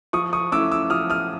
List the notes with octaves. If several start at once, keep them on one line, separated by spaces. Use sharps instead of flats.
F3 C#6 D#6
C#6 D#6
A3 C#4 E4 D6 E6
D6 E6
F3 D#6 F6
D#6 F6